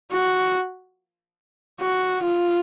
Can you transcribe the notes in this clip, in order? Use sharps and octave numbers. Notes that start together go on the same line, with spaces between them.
F#4
F#4
F4